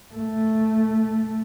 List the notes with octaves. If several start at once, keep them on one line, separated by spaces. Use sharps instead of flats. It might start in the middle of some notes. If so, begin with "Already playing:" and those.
A3